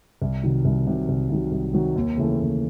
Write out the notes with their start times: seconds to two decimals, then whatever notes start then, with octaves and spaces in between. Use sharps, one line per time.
0.22 C2
0.43 C3 D#3 F#3
0.65 C2
0.87 C3 D#3 F#3
1.09 C2
1.30 C3 D#3 F#3
1.52 C2
1.74 C3 D#3 F#3
1.96 D#2
2.17 C#3 E3 A3
2.40 D#2